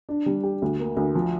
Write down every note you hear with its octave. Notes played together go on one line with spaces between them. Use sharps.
D4
G3
G4
D2
A#3
D2
F3